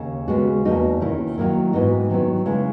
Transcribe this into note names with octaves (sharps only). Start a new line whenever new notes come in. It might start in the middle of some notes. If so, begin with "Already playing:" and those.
Already playing: D#2 C#3
D#2 C#3 G#3 B3 F#4
E2 B2 A#3 D#4 F#4
D#2 D#3 A#3 C#4 E4
D#3 F#3 A#3 E4
G#2 E3 B3 D#4 F#4
D#3 F#3 B3 E4
C#3 G#3 B3 E4